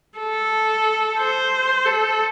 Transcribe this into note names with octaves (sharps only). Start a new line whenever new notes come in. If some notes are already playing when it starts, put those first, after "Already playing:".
A4
C5
A4